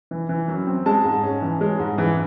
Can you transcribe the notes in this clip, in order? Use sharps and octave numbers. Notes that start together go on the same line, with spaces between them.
E3
E3
F#2
C4
G#3 A5
G#2
C#4
E3
G#3
G#2
E3